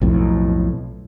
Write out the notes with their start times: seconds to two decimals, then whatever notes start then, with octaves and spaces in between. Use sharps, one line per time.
0.01 B1 F2 A2